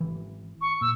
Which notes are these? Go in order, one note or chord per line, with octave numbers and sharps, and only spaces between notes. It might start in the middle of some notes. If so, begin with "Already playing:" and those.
G#1 E3
C#6
A#2 E6